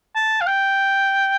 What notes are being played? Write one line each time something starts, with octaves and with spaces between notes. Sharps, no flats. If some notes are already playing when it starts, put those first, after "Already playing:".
A5
F5
G5